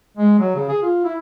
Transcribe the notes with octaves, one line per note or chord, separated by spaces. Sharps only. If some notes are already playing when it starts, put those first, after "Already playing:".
G#3
F#3
C#3
G#4
F4
E4